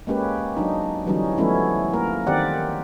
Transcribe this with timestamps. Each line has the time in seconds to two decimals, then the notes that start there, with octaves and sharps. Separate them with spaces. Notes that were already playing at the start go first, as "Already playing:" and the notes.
0.07 G#3 A#3 C#4 G4 B4
0.57 F#3 D4 D#4
1.06 D3 E3 F#3 G3 C#4 D#4
1.38 F3 F#3 A3 B3 C#4 E4
1.94 A#3 A#4
2.27 D#3 C4 G4 D5 F#5